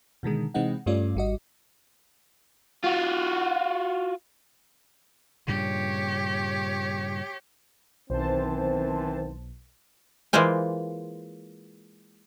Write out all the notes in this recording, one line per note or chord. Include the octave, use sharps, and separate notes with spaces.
B2 D3 D#3 G#3
C3 E3 G#3 C4 D#4 F#5
G2 G3 A3 C#4 F4 D5
G#1 G3 F#4 D#5
F4 F#4
G2 A#2 C#3 G4 C#5
B1 D#3 E3 C4 C5 A5
E3 G#3 A#3 F4 C5 G#5